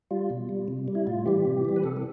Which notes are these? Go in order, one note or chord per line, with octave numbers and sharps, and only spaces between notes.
G3 F4
B2
G3
C3
G3
E4
A2 F4
E3 G3 G4
C3
E3 G3
B4
C3 A4
A4